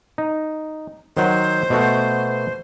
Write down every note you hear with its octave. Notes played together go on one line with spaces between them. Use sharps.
D#4
D#3 F#3 C5 F#5
B2 A3 F#4